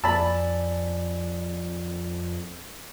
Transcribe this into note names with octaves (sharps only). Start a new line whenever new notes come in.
F2 D5 G#5 A5 B5 E6